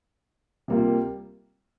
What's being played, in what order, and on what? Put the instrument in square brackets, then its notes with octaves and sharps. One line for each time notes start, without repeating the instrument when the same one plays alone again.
[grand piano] C3 G3 A#3 F4